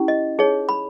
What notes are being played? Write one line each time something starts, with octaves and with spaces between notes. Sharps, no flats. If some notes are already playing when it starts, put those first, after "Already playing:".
Already playing: C#4 E4 G4
D#5
D#4 G#4 C#5
B5